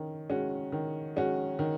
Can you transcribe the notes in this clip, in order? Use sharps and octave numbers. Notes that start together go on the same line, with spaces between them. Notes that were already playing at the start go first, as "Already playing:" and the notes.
Already playing: D#3 C#4
G#3 C#4 F#4
D#3
G#3 C#4 F#4
D#3